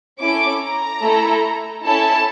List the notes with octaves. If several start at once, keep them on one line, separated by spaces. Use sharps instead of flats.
C#4 E4 A4 D6
A#5
A3 E4 A4
C#4 E4 A4 A5